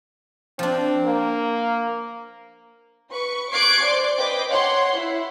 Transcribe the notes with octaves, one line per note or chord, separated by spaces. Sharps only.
F3 C4 D4
A#3
B4 C#6
C#6 D6 F#6 G#6 C7 D7
C5 D5 C6 D6
B4 D#5 G5 D6
C#5 F#5 C6
E4